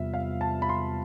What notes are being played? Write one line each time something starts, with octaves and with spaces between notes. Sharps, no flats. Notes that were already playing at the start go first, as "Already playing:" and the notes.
Already playing: E2 C3 G3 B3 F4 E5
F5
A5
B5
C6